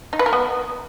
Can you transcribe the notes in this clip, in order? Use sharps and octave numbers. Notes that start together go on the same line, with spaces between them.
D#4
B4
A#4
B3